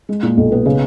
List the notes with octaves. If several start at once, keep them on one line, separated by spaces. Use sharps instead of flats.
G#3
A#2
B1
B3
C#3